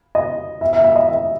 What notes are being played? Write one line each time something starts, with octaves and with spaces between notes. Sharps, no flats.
D#5
E5
E5
E5
D#5
E5